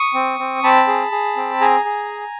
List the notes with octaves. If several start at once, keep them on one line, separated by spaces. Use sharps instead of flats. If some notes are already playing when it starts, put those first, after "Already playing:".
Already playing: C#6 D#6
C4
C4
C4 A5 B5
G#4
G#4
C4
G#4 G#5 A#5
G#4